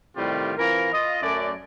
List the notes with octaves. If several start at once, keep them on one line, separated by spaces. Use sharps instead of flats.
A2 C3 D#3 G3 F4 G4
E3 C4 F4 A#4
F4 D#5
F#2 A3 D5